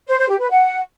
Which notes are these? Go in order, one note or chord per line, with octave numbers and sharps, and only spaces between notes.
C5
C5
G4
B4
F#5